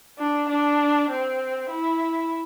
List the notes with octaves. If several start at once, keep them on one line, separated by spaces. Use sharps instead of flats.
D4
D4
C4
E4